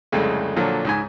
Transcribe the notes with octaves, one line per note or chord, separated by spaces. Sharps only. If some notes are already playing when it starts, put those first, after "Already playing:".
C2 F2 C#3 G#3 A3
A#2 D3 F3 F#3
C#2 G#2 G#5